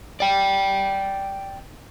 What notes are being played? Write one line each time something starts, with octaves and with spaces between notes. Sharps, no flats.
D5 G5